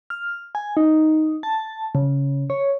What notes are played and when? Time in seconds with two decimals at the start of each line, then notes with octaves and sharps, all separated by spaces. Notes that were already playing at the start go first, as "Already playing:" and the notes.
0.10 F6
0.55 G#5
0.77 D#4
1.43 A5
1.95 C#3
2.50 C#5